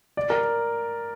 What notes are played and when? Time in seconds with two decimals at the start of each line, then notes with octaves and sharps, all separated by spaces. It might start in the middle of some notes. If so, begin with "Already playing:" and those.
0.17 D5
0.30 A#4